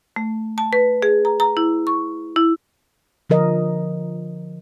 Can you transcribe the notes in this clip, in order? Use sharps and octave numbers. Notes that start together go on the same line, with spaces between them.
A3
A5
B4
G#4
A#5
A#5
E4
C#6
E4
D3 F3 A#4 D#5